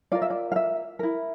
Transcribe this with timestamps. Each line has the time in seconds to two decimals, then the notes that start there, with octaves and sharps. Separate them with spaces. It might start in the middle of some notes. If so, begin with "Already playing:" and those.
0.12 F4 A#4 D5
0.22 E5
0.30 D5
0.52 F5
0.56 E5
0.99 E4 A#4